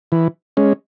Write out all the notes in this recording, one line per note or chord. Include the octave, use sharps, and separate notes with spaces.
E3
G#3 C#4